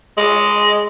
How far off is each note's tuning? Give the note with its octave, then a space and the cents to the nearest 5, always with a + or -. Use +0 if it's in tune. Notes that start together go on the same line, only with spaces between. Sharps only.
G#3 +0